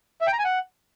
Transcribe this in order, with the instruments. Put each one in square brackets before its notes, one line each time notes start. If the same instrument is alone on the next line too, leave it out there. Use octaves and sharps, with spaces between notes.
[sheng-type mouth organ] E5
G5
A#5
G#5
F#5